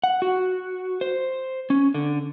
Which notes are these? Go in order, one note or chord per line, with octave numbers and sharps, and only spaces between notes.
F#5
F#4
C5
C#4
D3